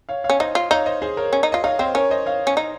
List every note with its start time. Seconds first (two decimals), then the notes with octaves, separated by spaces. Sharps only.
0.09 C#5 F5
0.24 C#5 F5
0.30 C#4
0.40 D#4 C5 D#5
0.55 F4
0.71 D#4 C#5 F5
0.86 C5 D#5
1.02 G#4 C5
1.17 A#4 C#5
1.33 C#4
1.43 D#4
1.52 F4 D#5
1.64 D#4 C#5 F5
1.79 C4 C5 D#5
1.95 C#4 A#4 C#5
2.10 C5 D#5
2.26 C#5 F5
2.47 C#4
2.57 D#4